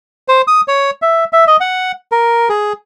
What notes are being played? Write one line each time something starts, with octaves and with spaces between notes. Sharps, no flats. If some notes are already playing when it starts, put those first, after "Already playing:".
C5
D#6
C#5
E5
E5
D#5
F#5
A#4
G#4